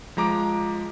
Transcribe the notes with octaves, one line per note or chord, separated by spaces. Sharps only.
F3 G#3 A#5 D6